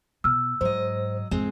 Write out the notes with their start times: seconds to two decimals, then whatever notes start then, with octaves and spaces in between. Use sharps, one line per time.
0.24 B2 E6 F6
0.61 G#2 F#3 C5 D#5
1.31 F2 A2 G#3 C4